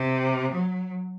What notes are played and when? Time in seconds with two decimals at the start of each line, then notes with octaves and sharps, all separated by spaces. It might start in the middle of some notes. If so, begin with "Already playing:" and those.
Already playing: C3
0.52 F#3